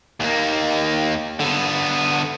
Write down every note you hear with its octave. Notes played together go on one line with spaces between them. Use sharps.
D#2 A#3
D3 B3